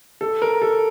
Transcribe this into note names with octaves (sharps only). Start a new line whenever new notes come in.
A4
A#4
A4